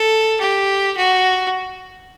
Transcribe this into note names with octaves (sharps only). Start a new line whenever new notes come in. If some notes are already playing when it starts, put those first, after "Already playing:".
Already playing: A4
G4
F#4